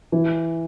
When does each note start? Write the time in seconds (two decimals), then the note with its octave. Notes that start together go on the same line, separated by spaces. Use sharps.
0.12 E3